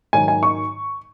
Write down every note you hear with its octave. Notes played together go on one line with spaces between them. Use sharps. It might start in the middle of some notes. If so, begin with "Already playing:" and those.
G#2 D#3 F#3 G#5
G#5
C#6